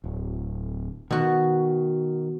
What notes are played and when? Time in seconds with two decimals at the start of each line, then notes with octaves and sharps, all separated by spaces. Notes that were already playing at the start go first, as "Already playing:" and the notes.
0.04 D1
1.11 B2 D#3 F#4